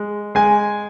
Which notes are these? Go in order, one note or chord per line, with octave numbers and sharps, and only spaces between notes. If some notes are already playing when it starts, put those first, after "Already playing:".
Already playing: G#3
G#3 G#5